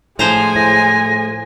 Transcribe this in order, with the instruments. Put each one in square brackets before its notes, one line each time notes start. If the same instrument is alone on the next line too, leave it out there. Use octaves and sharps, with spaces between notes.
[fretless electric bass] A2 [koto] F3 C5 A#5 [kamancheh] G#3 G#5
[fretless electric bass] A2 [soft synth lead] A#6